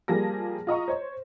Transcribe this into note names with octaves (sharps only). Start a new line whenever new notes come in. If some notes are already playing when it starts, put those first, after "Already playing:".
F3 G3 A#3 G#4 A5 A#6
F4 D#5 A#5 C#6
C5 C#5